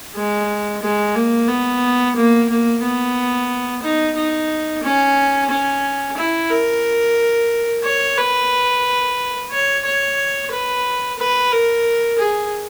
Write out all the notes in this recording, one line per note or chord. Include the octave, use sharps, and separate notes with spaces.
G#3
G#3
A#3
B3
A#3
A#3
B3
D#4
D#4
C#4
C#4
E4
A#4
C#5
B4
C#5
C#5
B4
B4
A#4
G#4